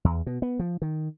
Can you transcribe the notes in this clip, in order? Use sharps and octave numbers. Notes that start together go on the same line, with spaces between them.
E2
B2
B3
F3
D#3